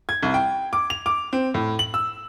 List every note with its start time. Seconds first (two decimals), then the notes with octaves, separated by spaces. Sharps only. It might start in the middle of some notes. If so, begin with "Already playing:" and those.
0.09 G#6
0.23 C2
0.34 G5
0.73 D6
0.90 F7
1.06 D6
1.33 C4
1.54 A2
1.79 F#7
1.94 E6